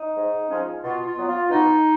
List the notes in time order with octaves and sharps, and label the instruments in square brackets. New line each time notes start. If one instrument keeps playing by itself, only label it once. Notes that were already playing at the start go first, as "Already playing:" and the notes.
Already playing: [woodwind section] D#4
G#2
F3 G#3 C#4
B2 F4
F4
F#3 B3
F4
B2 D#4